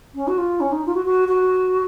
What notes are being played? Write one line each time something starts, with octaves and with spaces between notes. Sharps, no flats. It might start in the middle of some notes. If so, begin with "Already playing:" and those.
C#4
F#4
F4
C#4
D#4
F4
F#4
F#4
F#4